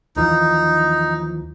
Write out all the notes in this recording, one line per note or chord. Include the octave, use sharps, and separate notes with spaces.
D#2 E3 F3 D#4